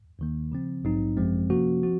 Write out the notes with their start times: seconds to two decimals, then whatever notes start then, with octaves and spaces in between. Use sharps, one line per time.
0.19 D#2 D#3 A#3
0.52 C#3 F3 C4
0.84 A#1 G#2 F#3 C4 D#4
1.17 G#1 F#2 F3 G#3 C4
1.50 C3 F3 A#3 C#4 F#4
1.83 F3 C4 F#4